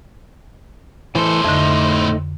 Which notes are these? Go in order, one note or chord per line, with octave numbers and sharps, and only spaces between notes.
A2 E3 A4 C5
F2 D3 A3 D#4